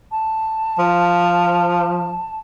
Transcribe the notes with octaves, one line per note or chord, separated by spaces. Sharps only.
A5
F3